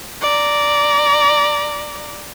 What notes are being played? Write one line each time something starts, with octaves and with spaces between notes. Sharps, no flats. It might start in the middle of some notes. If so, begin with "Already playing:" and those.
D5 A#5